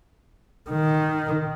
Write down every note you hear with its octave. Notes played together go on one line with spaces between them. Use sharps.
D#3